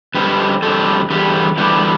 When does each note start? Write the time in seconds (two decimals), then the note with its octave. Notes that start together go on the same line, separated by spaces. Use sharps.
0.14 F2 D3 G3 C4 G4 B4
0.62 F2 D3 G3 C4 A4 C5
1.10 E2 D3 G3 G4 B4
1.58 E2 D3 G3 G4 B4